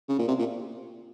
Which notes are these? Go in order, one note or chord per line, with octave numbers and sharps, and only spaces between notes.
C#3
A#2
C3
A#2